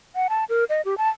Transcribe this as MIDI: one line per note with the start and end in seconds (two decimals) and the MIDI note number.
0.15 0.27 78
0.30 0.44 81
0.49 0.64 70
0.70 0.81 75
0.85 0.97 67
0.98 1.08 81